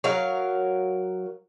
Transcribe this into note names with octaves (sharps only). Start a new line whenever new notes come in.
F#3 A#4 F5